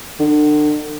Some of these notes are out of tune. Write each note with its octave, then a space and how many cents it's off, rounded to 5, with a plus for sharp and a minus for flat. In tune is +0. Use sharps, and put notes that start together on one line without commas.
D3 +35